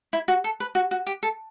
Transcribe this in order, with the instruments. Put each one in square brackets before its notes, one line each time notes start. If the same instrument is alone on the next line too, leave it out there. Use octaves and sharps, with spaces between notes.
[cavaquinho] E4
F#4
A4
B4
F#4
F#4
G4
A4